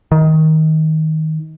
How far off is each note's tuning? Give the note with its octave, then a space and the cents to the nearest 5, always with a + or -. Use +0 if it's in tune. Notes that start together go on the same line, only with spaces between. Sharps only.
D#3 +15